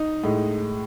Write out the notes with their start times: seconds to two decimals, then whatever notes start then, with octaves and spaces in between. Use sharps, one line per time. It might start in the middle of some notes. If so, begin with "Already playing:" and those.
Already playing: D#4
0.24 A2 G#3